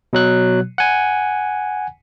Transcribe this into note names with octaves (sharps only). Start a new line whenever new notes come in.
B2 F#3 F#6
F#5 G#5